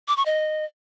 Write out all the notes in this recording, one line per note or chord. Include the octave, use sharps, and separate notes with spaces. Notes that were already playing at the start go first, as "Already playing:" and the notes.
D6
C#6
D#5